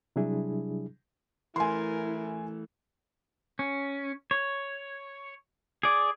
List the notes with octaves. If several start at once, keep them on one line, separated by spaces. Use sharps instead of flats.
C3 F#3 G3 D4 E4 G#4
E3 A3 E4 A#4 G#5 C6
C#4
C#5
G#4 D5